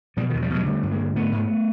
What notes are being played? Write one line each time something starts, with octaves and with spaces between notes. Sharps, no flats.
B2 F3 G3
D#3 F3
E2
F3 G3
B2 F#3 G#3
D3 G3 A3
G2
G#3 A#3
D3
G#2 A3 B3
G#2